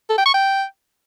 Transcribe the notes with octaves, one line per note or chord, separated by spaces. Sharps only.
A4
G5
C#6
G5